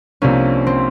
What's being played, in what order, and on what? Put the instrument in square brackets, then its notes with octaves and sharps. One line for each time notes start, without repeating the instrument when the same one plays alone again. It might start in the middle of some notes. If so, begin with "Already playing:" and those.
[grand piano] C2 C3 F3 A#3 D4 [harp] C#4
[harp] C4